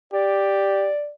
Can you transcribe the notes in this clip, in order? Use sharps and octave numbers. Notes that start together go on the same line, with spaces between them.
G4 D5